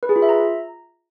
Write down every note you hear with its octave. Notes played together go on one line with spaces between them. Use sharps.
B4
G#4
F4
E5
A#5